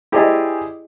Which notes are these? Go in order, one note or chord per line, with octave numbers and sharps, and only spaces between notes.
E4 G4 G#4 C5 D5 D#5